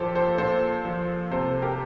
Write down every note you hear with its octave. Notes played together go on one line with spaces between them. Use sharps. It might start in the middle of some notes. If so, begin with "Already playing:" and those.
Already playing: A#2 F3 G4 A4 C5
A4 C5
A#2 A4 C5
F3
C3 A4 C5
G4 A#4